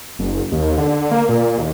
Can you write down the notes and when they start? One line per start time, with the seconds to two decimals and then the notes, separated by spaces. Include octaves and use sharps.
0.19 F#1
0.52 D#2
0.78 D3
1.11 A#3
1.29 A#2
1.58 D#2